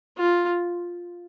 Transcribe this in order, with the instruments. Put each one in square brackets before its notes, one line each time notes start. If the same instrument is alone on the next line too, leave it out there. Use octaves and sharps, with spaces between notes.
[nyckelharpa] F4